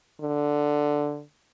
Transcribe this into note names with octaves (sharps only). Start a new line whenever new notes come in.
D3